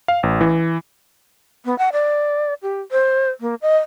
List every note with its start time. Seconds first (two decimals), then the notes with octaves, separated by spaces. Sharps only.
0.08 F5
0.23 A1
0.41 E3
1.65 B3
1.78 F#5
1.92 D5
2.62 G4
2.92 C5
3.41 A#3
3.62 D#5